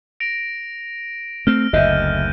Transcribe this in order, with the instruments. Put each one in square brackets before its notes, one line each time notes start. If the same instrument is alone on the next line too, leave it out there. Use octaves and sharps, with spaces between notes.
[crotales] A#6 D7 F7
[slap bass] A3 C4 [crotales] F6
[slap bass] F#1 D2 D3 [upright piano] D#5 E5 [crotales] F#6 G6 D#7